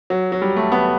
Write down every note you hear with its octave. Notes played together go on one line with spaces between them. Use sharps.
F#3
F#3
G3
A3
B3